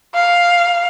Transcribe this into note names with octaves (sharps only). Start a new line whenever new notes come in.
F5